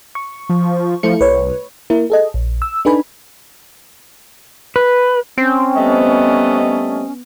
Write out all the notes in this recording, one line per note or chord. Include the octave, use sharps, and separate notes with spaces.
C#6
F3
F3 A3 E4 C#7
C2 B4 C#5
A#3 E4 A#4
G#4 A4 D#5
A#1
E6
D4 D#4 A4 B4 G#5 B5
B4
C4 C#4
G3 A3 B3 D#5